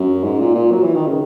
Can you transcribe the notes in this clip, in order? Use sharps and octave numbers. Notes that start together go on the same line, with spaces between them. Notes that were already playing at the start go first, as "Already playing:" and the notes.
Already playing: F#2
G#2
A#2
A#2
F#3
E3
D#3
C#3